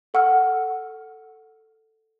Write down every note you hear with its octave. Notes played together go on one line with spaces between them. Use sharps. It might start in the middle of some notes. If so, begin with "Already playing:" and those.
A4 F#5 E6 F6